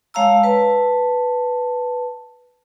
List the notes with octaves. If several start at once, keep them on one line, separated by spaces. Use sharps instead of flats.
G#3 C#5 F5 A5 A#5 E6
B4 A5